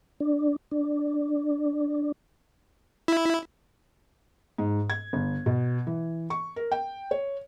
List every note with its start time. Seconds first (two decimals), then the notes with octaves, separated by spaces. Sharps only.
0.20 D4
0.71 D4
3.08 E4
4.58 G#2
4.90 G#6
5.13 G1
5.46 B2
5.87 E3
6.30 C#6
6.56 A#4
6.72 G5
7.11 C#5